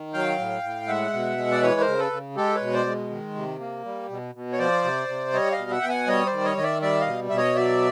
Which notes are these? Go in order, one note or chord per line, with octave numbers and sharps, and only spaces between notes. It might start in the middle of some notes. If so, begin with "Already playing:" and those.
Already playing: D#3
F#3 F5 G5
A2
A2
G#3 E5 F#5
B2
G#3
D5
E3 B4 C#5
A#4 C5
C#3
A4 B4
C#3
G#3 G4 A4
B4 C#5
B2
C5 D5
G#3
D#3
C3
A#3
G3
B2
B2
C#5
F3 C5 D5
C3
C3
G3 C#5 D#5
D#5 F5
B2
E5 F#5
B2 G5
F#5 G#5
G3 C#5 D#5
C5 D5
D#3
C#5 D#5
D#3 D#5
D5 E5
G3 D5 E5
D#5 F5
B2
B2 E5
C#5 D#5
F#3 D5 E5